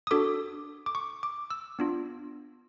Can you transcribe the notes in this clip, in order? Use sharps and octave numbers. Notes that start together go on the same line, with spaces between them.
D#6
D4 F#4 A4 D6
D6
C#6
D6
E6
B3 D4 F4